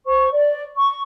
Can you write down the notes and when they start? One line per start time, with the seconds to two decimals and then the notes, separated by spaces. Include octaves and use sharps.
0.06 C5 C#6
0.31 D5
0.76 C#6